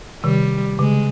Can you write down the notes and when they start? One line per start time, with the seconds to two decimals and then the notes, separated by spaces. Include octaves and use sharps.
0.24 C3 D#3 G3
0.79 C#3 G#3